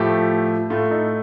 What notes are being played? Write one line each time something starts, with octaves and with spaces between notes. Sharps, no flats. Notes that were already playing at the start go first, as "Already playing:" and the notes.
Already playing: A2 F3 A3 G4
A2 A3 F4
D#4